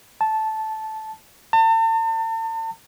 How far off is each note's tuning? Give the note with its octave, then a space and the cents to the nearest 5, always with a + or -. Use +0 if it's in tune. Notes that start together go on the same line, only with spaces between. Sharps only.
A5 -10
A5 +40